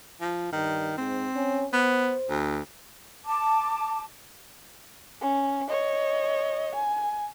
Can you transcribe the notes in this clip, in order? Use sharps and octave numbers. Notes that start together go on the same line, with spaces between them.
F3
G2 D#3
G#2 C4
C#4
B3 C5
D2
A5 D6
C#4
C#5 D#5
G#5